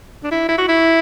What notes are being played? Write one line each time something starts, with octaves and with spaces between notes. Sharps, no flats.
D4
E4
E4
F#4
E4